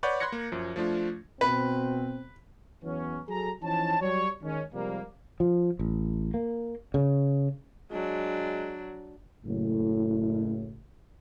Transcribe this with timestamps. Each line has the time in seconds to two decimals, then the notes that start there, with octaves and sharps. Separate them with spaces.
0.03 B4 C#5 D5 F#5 G6
0.20 B5 C6 F#6 G#6 A#6 C#7
0.32 A#3
0.52 F#2 F3
0.76 F3 A3 D4 F4
1.41 B2 C4 B4
2.83 E2 E3 F#3 B3 C#4
3.29 F#3 G#4 A4 A#5
3.62 E3 F3 C#4 D#4 A5
4.00 F#3 G3 C#5
4.42 D#3 G#3 C#4
4.73 C3 F3 G3 G#3 A#3
5.40 F3
5.79 A1
6.34 A#3
6.94 C#3
7.92 F#3 G#3 D4
9.45 F#1 A2